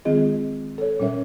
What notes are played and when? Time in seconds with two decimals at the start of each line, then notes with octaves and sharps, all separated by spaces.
0.05 D#3 G#3 C4 F4 G#4 D#5
0.78 A4 C#5
1.00 A#2 G3 C#4 A#4 C#5 E5